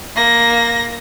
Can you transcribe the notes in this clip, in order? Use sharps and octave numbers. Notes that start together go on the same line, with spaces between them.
A#3 A#6